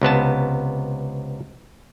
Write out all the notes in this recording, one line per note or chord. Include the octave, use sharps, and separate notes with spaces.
C#2 C3 B3 A5